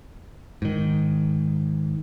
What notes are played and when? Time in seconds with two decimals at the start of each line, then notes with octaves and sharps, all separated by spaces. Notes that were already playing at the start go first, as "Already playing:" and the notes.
0.62 G#2 D#3